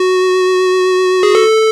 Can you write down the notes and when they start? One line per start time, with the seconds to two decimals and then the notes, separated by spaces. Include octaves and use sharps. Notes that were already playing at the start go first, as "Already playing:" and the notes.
Already playing: F#4
1.23 G#4
1.35 A4